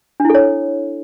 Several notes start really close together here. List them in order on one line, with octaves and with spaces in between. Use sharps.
D4 E4 A4 C#5